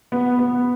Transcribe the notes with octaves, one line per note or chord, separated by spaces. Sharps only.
B3
B3